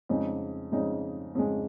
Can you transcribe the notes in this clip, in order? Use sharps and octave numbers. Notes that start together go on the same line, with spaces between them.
F2 C#3 G#3 D#4
F2 C#3 G#3 D#4
F2 C#3 G#3 D#4